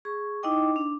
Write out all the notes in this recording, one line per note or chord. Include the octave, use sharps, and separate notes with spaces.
G#4 C#6
D#4 E4 D#5 G5 D6
D4